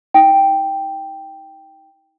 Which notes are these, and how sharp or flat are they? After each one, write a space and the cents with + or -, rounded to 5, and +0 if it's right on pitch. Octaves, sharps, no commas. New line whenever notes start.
D#4 +30 G5 +0